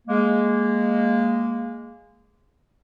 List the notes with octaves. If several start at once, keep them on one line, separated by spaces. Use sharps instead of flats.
G#3 A#3